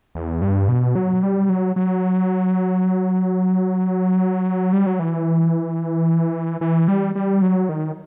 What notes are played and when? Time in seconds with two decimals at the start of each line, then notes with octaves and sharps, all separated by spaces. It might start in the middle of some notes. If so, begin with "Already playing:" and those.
0.15 E2
0.42 G2
0.68 B2
0.95 F#3
1.23 G3
1.49 F#3
1.76 F#3
4.73 G3
4.86 F#3
4.99 E3
6.61 E3
6.88 G3
7.16 G3
7.42 F#3
7.69 D#3